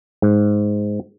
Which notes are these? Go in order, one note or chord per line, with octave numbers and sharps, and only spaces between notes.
G#2